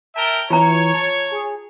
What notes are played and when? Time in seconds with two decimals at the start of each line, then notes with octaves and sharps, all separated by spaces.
0.16 A#4 E5 G5 A5
0.50 E3 F4 C#5 A#5
0.94 A5
1.32 G#4